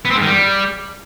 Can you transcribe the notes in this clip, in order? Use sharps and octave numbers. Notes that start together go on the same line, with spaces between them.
B3
C4
G#2
D#3
G3